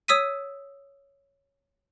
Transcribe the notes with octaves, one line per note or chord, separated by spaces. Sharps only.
C#5 D#6 E6 B6 D#7